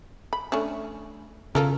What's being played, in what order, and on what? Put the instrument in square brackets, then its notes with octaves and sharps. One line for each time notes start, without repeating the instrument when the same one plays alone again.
[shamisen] B5
A3 C#4 D4
[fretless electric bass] C#3 [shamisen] F4 A4 A#4